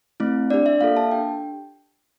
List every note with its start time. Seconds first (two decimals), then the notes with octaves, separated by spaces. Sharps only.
0.20 A3 C4 E4
0.50 D4 G4 D5
0.66 E5
0.81 A#3 F4 A4 F5
0.97 A5
1.11 D4 G4 G5